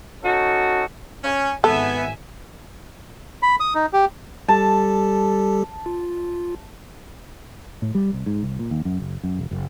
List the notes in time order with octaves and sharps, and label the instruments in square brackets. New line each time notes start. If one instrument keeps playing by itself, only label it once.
[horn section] C#4 D#4 F#4 A4
C#4
[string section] G#1 E5 G#5 [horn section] B3 [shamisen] A4
[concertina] B5
D#6
D#4
G4
[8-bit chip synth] G3 G4 A4 [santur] A5
[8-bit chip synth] F4
[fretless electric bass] A2
G3
C2
G#2
C2
A#2
D#2
F#2
F#1
F#2
E1
F#1